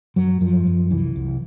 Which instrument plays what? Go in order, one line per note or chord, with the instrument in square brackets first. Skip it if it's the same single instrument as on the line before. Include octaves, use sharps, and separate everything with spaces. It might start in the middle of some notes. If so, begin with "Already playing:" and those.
[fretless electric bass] F#2 F#3
F#2 F3
F#2
C2 E3
C2